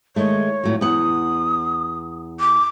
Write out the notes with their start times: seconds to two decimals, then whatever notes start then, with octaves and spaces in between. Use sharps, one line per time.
0.16 D#3 G#3 A3 C#5
0.64 F2 A2 F#3
0.81 E2 F#5 D#6
2.40 D6